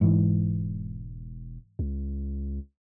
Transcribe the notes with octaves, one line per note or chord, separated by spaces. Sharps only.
E1 G#2 E3
C#2